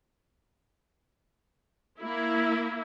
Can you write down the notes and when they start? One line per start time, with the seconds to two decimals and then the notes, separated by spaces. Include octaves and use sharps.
1.99 A#3 E4